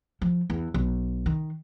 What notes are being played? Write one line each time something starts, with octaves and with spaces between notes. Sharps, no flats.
F3
E2
B1
D#3